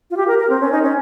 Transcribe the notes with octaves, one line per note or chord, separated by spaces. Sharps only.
F4
G4
A#4
A#4
C4
C#4
D#4
C#4